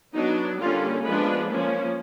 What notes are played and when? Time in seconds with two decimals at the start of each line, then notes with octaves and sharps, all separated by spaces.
0.14 F#3 B3 D4 D#4
0.60 D3 G3 A#3 C#4 F4
1.05 F3 G#3 B3 D4 B4
1.50 F3 A#3 C#4